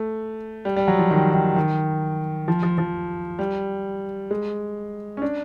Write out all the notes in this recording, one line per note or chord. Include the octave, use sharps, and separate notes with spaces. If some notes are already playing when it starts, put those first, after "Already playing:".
Already playing: A3
G3
G3
F#3
F3
D#3
D#3
D#3
F3
F3
F3
G3
G#3
C#4
D4